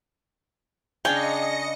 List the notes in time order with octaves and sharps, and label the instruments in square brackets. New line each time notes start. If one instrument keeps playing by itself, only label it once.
[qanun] C#3 D4 F5 [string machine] D#5 A#6 C#7 [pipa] G5 [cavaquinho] G#5